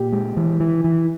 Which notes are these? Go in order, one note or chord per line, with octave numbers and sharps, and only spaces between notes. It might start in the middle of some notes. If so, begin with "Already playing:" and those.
Already playing: A#2 G4
G#3
E3
E3
E3